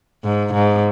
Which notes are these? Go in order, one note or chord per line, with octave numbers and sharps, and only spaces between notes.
G#2
G#2